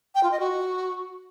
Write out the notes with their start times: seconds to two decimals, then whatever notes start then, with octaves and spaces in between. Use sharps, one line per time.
0.15 G5
0.23 F4
0.31 D#5
0.40 F#4